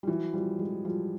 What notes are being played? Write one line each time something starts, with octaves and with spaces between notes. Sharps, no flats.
G3
E3 F#3
F3 G3
F#3 G#3
F3 G3